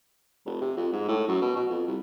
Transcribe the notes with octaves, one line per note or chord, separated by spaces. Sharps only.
F1
C3
F2
G#2
A2
F#2
B2
B2
F2
C2